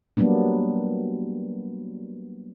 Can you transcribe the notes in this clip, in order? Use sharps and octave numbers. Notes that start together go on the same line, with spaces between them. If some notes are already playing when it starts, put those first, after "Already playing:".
F#3 G3 A#3 B3 D4